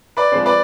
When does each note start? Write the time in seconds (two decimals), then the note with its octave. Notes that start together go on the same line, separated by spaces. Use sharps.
0.17 B4 D5
0.32 F3 G#3 C4
0.46 B4 D5